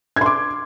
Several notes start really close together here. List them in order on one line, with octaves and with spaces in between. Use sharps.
G#6 C6 D6